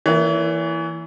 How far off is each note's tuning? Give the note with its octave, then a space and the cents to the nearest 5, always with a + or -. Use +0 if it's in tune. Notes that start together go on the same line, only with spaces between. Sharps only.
E3 +5 A#3 +0 C#5 +45